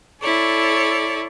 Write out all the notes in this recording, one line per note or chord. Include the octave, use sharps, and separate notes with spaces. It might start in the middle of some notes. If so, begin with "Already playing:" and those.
E4 A4 C#5 D5